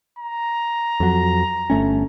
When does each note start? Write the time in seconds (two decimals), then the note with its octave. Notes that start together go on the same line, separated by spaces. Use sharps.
0.19 A#5
1.00 F2 F#3
1.70 G1 A3 C#4